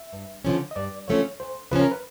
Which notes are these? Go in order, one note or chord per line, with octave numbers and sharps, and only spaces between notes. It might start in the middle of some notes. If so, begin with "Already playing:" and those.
Already playing: E5
G2
D3 F3 A3 C#4
D#5
G2 D5
D3 F3 A3 C#4 C#5
D2 C5
C#3 F3 G#3 C#4 B4
A#4
B4